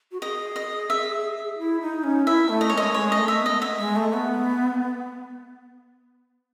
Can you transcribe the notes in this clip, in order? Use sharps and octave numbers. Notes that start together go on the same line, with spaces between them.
F#4
G#4 D#5
D#5
E5
E4
D#4
C#4
E4 E5
A3
D#5
G#3 C#5
D#5
G#3 C#5
A3 D#5
E5
B3
D#5
E5
G#3
A3
B3